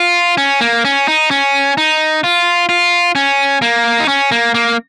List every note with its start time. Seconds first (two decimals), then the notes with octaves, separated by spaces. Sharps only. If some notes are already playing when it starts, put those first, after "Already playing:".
Already playing: F4
0.38 C#4
0.61 A#3
0.85 C#4
1.08 D#4
1.31 C#4
1.78 D#4
2.24 F4
2.69 F4
3.15 C#4
3.62 A#3
4.00 D#4
4.08 C#4
4.32 A#3
4.54 A#3